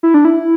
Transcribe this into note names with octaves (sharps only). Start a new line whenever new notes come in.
E4
D4
E4